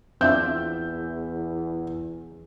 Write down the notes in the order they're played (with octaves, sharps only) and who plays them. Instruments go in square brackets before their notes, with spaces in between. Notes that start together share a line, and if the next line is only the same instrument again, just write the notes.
[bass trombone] E2 [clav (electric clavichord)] C4 D4 F4 [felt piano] E5 G6